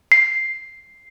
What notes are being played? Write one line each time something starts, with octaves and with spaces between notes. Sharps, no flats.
C7